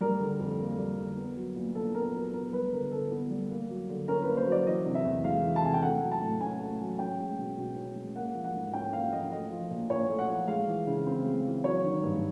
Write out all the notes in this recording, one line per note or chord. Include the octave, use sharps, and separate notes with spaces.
G3 A#4
D3
F2
A#3
G3
D3
B3
F#3
A#2
A#2 A4
B3 A#4
F#3 A#4
B3 A#4
G3 B4
D3 A#4
D3 A4
B3
G3
A#3
F#3
D3
C#4 A#4
B4
A#3
C5
F#3 D5
E3 D#5
C3
E5
E2
G#3 F5
E3
A5
C3 G#5
G5
A3 F#5
F#3
A5
A2
C#4 G#5
A3
F#3
C#4 G5
G#3
B2
B2
C#4
G#3
A#3 F#5
F3
F#5
G#2
C#4 G5
A#3 F5
F3 D#5
A3 D#5
F3
A#2
A#2 C#5
A3
F#5
F3
G#3 F5
E3
C#3
C4
G#3
E3
F#3 C#5
D#3
G2